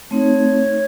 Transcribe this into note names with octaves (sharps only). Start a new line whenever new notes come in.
A3 C4 D#4 C#5